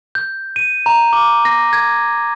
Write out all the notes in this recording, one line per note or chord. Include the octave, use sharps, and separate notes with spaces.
G6
D#7
A#5
D6
A#6
G#6